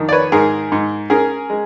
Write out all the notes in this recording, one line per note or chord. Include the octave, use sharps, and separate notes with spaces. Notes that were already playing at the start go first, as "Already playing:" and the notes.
Already playing: F2 D#3
D5
B4 C#5
G#2 G#4 A#4
G#2
C#4 G#4 A#4
G#3